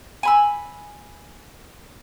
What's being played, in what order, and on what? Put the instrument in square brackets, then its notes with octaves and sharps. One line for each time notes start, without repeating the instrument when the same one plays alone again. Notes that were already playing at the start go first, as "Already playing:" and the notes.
[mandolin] G#5 B5 E6